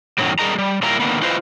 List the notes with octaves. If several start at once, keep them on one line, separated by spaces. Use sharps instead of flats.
F#2 A2 C3 D#3 F#3 G3
G3 G#4 A#4 D#5 A#5
G3 G#3
A#2 G3 E4 F4 A#4 A#5
D3 D#3 A#3 B3
E4 F4 B4 C5 D#5 F5